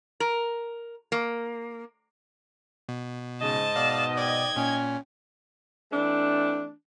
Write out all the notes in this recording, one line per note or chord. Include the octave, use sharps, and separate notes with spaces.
A#4
A#3
B2
G#2 C#3 D#5 A5
B2 D5 F5
D5 G5 G#6
A#2 C#4
E3 A3 C4 D4